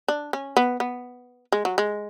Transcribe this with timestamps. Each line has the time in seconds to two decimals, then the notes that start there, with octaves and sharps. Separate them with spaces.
0.08 D4
0.33 C#4
0.57 B3
0.80 B3
1.52 G#3
1.65 F#3
1.78 G#3